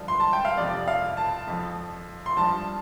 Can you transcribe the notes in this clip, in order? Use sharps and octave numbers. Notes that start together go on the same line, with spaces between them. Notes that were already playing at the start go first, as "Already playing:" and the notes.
Already playing: G2 D3 F3
C6
A5
G5
F5
F2 C3 F3 D5
F5
A5
F2 F3
C6
G2 F3 A5